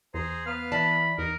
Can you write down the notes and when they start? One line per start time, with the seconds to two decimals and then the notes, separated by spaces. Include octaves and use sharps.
0.14 E2 G#4 C5 A#5
0.46 B3 B4 F5 F6
0.72 E3 D5 A5 B5
1.18 E2 D#4 A#4 D#5